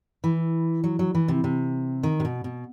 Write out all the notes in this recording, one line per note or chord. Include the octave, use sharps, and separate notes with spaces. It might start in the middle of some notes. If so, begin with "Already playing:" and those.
E3
F#3
F#3
E3
C3
C3
D#3
C3
B2
B2